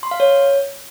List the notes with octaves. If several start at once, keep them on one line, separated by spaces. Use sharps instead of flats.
C6
F5
C#5